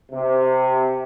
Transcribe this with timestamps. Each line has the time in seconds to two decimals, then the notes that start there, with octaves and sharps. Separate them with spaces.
0.12 C3